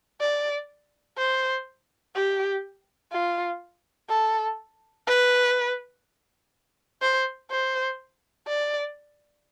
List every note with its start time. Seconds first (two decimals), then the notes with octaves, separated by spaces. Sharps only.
0.21 D5
1.18 C5
2.15 G4
3.13 F4
4.09 A4
5.07 B4
7.02 C5
7.51 C5
8.48 D5